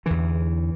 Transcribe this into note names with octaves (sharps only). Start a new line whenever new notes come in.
E2 D3 E3